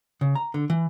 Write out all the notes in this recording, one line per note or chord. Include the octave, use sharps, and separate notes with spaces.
C#3
A#5
D3
E3